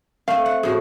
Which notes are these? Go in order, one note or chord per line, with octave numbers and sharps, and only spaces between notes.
A3 C4 F5
F#5
A2 F3 F#4 G#4